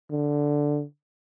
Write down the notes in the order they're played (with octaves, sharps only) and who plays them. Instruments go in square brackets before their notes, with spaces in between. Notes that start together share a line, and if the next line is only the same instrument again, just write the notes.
[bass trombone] D3